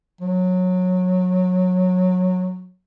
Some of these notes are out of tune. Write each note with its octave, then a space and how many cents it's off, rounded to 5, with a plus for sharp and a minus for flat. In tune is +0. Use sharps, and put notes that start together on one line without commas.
F#3 -15